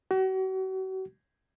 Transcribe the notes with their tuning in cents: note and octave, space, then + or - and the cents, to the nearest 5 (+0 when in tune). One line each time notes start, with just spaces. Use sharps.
F#4 +40